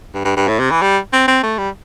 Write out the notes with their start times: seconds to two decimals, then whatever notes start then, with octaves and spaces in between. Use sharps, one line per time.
0.14 G2
0.25 G2
0.36 G2
0.48 A2
0.59 C3
0.71 E3
0.82 G3
1.13 C4
1.28 C4
1.43 A3
1.58 G3